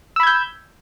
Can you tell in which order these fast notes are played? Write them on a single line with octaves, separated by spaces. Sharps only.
E6 B5 G#6 G6